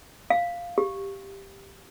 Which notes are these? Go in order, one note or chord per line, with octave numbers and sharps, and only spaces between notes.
F5
G4